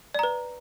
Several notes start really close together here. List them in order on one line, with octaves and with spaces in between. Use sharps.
D5 A#5 B4